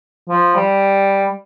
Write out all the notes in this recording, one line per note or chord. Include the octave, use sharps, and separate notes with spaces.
F3
G3